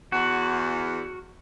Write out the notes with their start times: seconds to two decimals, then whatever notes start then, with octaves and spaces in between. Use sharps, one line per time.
0.12 E2 F#4